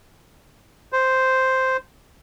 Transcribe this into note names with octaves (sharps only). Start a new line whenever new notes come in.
C5